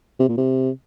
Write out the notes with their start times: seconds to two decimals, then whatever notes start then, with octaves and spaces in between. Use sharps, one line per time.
0.20 C3
0.29 A#2
0.37 C3